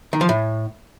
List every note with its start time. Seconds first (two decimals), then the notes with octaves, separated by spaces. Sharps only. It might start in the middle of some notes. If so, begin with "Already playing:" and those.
0.13 D#3
0.21 F3
0.29 A2